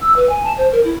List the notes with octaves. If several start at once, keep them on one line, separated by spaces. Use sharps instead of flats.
E6
B4
G#5
A5
C5
A#4
E4